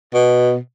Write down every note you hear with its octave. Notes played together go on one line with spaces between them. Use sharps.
B2